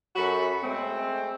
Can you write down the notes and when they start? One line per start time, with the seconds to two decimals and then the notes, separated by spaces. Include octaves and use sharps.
0.16 F#2 F#4 A4 B5
0.62 G#3 A3 C4